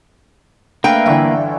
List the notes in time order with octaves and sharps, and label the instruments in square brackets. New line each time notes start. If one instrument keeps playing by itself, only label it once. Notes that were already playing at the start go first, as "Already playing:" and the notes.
[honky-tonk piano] A3 [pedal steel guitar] A#3 B4 [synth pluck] D4 E5 F5 [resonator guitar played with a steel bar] G5
[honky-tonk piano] G1 D3 E3 [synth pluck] E5